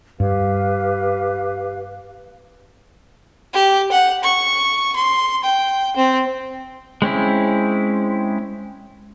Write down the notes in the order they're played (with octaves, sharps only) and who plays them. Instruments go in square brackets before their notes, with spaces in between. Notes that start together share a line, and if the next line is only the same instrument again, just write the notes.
[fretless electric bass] G2 [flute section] G4 B4 F5
[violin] G4
F#5
C#6
C6
G5
C4
[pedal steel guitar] G#3 C4 C#4 E4